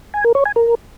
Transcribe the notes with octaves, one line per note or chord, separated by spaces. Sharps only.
G#5
A#4
C#5
G#5
A#4